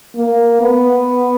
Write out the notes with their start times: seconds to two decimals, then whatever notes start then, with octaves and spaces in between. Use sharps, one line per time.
0.16 A#3
0.62 B3